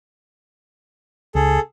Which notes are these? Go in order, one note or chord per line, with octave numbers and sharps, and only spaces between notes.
C#2 G#4 A4